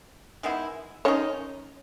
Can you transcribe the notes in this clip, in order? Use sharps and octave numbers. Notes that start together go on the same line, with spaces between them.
D#3 G#3 B3 E4
D#3 G#3 C#4 D#4 C#5